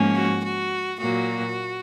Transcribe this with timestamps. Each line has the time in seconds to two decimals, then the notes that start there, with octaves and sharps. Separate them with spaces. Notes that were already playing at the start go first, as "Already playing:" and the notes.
Already playing: G#2 F3 A#3 C#4
0.15 F#4
0.44 F#4
1.01 A#2 F#3 A#3 F#4